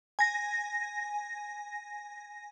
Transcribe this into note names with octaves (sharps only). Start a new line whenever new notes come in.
G#5 A#6